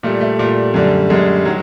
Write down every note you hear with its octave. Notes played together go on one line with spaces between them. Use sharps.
A#2 G3 A3
A3
A#2 G3
F#2 D3 G3
F#2 D3 G3 G#3
D#3 F#3